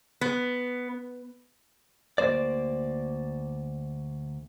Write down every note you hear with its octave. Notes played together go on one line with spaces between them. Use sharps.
B3
D2 E3 A#3 C5 D5